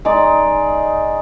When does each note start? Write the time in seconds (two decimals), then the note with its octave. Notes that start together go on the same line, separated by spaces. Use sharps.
0.05 G#3 D#4 D5